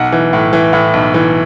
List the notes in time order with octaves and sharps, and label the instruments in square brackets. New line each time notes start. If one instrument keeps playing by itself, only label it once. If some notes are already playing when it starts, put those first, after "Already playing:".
Already playing: [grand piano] B1 F#5
E3
A2
E3
A2
B1
E3